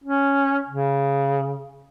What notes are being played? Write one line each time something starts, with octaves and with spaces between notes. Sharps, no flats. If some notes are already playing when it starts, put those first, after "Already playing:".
C#4
C#3